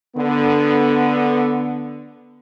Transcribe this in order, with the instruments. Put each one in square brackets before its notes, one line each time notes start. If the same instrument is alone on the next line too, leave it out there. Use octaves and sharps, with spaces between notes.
[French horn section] D3 B3